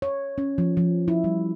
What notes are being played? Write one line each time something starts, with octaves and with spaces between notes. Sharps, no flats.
C#5
C#4
F3
F3
E4
G3